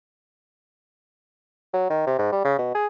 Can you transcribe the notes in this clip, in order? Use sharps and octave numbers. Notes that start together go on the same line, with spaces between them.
F#3
D#3
C3
G#2
G3
C#3
B2
G#4